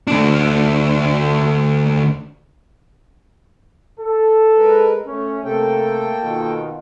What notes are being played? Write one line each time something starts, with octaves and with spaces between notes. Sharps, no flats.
D2 D4
A4
G#3 A#4 B4
A3 C#4
C3 A3 A#3 A4 G5
B2 D#3 F4